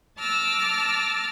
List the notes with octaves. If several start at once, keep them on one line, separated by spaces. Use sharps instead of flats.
A5 D6 E6 F6 A#6